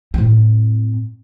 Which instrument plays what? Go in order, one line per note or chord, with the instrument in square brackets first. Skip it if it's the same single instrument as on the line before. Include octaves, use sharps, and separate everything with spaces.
[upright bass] A2 C4